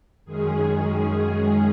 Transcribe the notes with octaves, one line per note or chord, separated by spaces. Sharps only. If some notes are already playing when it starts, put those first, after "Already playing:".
F#2 D#3 G#3 C#4 G#4